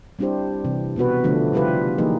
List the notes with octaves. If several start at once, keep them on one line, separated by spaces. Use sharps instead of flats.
G3 C4 D4 E4 G4 C5
C3 E3
B2 B3 F#4 B4
D3 F3 A3 D4
C#3 G3 E4 F4 G4 B4
E3 F#3 A#3 D#4 G4 G#4